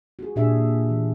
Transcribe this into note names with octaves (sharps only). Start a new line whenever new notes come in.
F#4 G#4
A#2 D4 G4 G#4 E5
E3